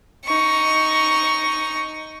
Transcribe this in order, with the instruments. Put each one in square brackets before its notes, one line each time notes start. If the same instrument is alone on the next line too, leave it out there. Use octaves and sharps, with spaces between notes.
[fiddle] D#4 C#6